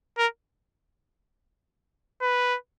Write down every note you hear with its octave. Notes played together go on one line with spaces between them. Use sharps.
A#4
B4